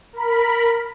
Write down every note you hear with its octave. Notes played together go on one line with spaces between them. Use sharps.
A#4 B5